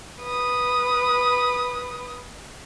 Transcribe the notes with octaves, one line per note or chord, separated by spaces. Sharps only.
B4 D#6